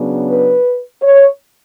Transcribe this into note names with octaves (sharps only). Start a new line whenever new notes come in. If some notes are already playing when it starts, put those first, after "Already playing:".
Already playing: C#3 F#3 B3 D4
B4
C#5